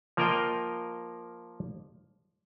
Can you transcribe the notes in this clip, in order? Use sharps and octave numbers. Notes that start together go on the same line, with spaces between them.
F3 A#3 F4 A#4 D#5 G5